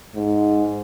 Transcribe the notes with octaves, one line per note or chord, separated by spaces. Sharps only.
G#2